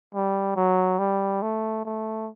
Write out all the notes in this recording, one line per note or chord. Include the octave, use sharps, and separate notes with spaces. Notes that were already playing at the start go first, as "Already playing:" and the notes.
G3
F#3
G3
A3
A3